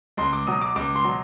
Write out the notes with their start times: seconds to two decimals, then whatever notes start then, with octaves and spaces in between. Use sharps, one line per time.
0.17 C#2 C6
0.33 D6
0.47 B2 F#3 D#6
0.61 D6
0.76 C#2 D6
0.96 C6
1.04 B2 F#3